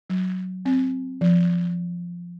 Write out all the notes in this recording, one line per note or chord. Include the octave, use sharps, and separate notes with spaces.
F#3
C4
F3